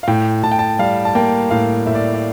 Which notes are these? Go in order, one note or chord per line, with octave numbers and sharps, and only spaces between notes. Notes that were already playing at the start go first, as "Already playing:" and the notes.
F5
A2 G5
A2 A5
G5
A5
G3 F5
A5
A#3 G5
A2 F5
A2 E5
D5
D5